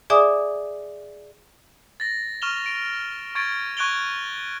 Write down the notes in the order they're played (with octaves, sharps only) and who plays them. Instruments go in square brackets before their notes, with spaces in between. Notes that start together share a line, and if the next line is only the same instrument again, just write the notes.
[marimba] G#4 D5 E5 G#5 D6 D#6
[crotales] A6 A#6
C#6 F6 E7 F7 G7
D7
C#6 G#6 A6 D7
C#6 F#6 G#6 D7 F7 G7